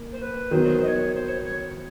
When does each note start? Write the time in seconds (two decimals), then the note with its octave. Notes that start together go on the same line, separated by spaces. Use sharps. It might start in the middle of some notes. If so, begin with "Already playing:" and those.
Already playing: A#3
0.12 C5
0.22 B4
0.51 D#3 F#3 B3 C5
0.82 D#5
0.87 C#5
1.13 C5
1.28 C#5
1.44 C#5